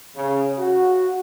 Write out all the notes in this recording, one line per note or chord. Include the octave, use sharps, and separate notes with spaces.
C#3
F#4